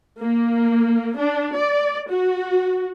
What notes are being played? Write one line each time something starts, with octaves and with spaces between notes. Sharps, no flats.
A#3
D4
D5
F#4